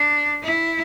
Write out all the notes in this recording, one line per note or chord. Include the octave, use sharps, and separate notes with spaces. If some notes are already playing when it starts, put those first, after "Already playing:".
Already playing: D4
E4